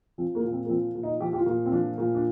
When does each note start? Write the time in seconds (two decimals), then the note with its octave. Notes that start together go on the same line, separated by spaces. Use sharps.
0.18 F3 C4
0.35 A#3
0.44 A#2
0.52 C4
0.65 A#3
0.69 F3 C4
0.95 A#2
1.03 D#4
1.20 F3 G4
1.33 G4
1.38 F4
1.46 A#2
1.66 C4
1.72 F3 D4
1.98 A#2
2.15 D4